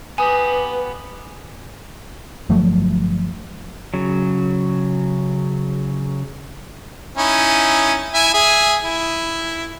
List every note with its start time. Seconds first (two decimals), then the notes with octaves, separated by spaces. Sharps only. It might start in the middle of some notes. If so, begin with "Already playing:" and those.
0.18 B3 G4 B4 G#5 D#6
2.49 G1 F3 F#3 A3
3.94 C#3 F#3
7.17 C#4 D#4 E4
8.14 E4 E5 G#5
8.34 G#4 E5 G#5
8.84 E4